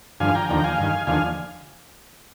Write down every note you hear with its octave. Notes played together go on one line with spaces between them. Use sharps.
G2 D3 F3 F5 G#5
G5 A#5
D#2 D3 F3 G5 A#5
F5 G#5
G2 D#3
D#2 D3 F3 F5 G#5